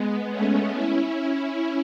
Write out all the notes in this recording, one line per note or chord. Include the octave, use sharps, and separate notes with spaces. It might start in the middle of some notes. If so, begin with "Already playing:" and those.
Already playing: G#3 B3
A3 C#4
C#4 E4
C#4 E4